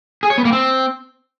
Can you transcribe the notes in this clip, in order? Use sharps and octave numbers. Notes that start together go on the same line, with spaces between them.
G#4
C#5
B3
A#3
C4